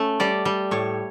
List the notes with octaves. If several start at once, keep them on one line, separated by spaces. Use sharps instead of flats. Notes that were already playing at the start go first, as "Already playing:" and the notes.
Already playing: A3 C#4
G3 D5
G3
A2 C#5